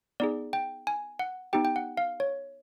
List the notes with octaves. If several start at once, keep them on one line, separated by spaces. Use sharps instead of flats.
B3 D#4 G#4 D5
G5
G#5
F#5
B3 D#4 G4 G5
G5
F#5
F5
C#5